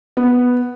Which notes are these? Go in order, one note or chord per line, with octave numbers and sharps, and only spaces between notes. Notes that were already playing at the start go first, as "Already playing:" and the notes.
B3